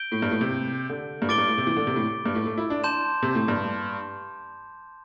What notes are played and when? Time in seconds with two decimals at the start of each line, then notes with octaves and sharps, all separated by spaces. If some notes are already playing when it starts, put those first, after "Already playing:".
Already playing: G6 D7 G7
0.12 A2
0.22 G2
0.31 A2
0.41 C3
0.89 D3
1.22 G2
1.28 A2 D6 A6 D7 G7
1.38 G2
1.48 A2
1.58 C3
1.67 E3
1.77 D3
1.87 C3
1.96 A2
2.26 G2
2.35 A2
2.46 A3
2.57 E4
2.70 D4
2.84 A5 C6 G6 E7
3.22 C3
3.35 A2
3.48 G2